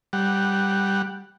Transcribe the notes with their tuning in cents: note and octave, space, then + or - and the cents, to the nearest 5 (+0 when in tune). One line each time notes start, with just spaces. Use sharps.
G3 +0 F#5 +0